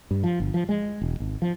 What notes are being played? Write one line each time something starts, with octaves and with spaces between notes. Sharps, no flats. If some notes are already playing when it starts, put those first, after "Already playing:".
G2
F3
G1
F3
G#3
E1
G#1
F3